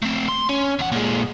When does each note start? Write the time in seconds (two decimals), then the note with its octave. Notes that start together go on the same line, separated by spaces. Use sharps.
0.02 A3 C4
0.28 C6
0.49 C#4
0.79 E2 F#5
0.92 A#2 G#3